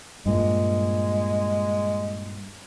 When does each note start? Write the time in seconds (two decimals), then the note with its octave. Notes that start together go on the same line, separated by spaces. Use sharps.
0.26 G2 A#2 G#3